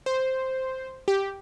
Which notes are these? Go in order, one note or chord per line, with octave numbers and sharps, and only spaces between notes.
C5
G4